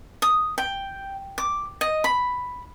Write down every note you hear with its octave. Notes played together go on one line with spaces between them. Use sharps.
D#6
G5
D6
D#5
B5